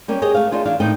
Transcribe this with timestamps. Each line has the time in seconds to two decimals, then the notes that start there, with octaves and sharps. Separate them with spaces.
0.08 G3 A#3 C#4 G4
0.22 G4 G#4 C#5 D#5
0.34 A3 F5
0.52 D4 D#4 F4 G#4
0.65 E3 D4 F5
0.80 D#2 A2 D#4 G5